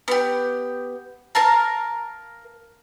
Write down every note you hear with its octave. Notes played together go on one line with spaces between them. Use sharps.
B3 G4
A#4 F5 A5 A#5